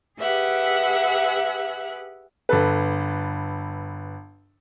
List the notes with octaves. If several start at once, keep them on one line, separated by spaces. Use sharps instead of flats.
G4 G#4 B4 E5 F#5 F#6
G1 A4 B4